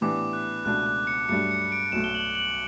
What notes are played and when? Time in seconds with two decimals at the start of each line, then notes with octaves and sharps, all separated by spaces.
0.01 A2 E3 B3 D4 G4 D6
0.33 F#6
0.65 C#2 B2 A3 D4 F#6
0.86 F#6
1.07 C#7
1.29 G2 F#3 A3 D4 G4 C#7
1.51 C#7
1.72 D7
1.92 B1 B2 A3 E7
2.04 G7
2.15 F#7
2.35 F#7